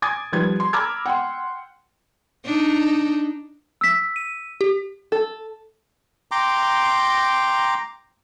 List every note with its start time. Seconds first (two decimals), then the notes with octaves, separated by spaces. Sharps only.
0.02 G#5 D6 D#6 G#6 A6
0.32 D#3 F3 G3 B4 G#6
0.60 C6
0.73 A#5 B5 D6 E6 F6 G#6
1.06 F#5 G5 C6
2.45 D4 D#4
3.81 E6 B6
4.16 D#7
4.61 G4
5.12 A4
6.31 G5 A#5 C6 D6